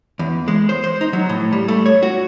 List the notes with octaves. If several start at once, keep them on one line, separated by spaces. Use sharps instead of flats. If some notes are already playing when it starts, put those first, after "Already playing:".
E2
G#3
C5
C5
D#4
F#3
A2
G3
A3
C#5
F#4